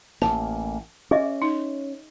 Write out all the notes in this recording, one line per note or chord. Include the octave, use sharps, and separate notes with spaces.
A1 A#3 A5
C#4 G#4 D#5 E5
D#4